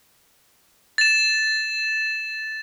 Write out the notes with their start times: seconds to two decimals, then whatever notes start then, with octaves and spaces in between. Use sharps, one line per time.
0.98 A6 E7